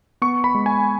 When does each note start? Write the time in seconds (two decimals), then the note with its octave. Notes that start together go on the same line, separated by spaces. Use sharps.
0.22 B3 C#6
0.44 B5
0.55 G#3
0.66 G#5